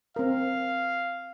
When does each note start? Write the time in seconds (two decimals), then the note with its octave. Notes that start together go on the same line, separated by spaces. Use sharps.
0.16 C4 A#4 F5